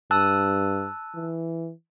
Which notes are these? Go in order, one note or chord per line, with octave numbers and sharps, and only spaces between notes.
G2 A5 E6 F#6
E3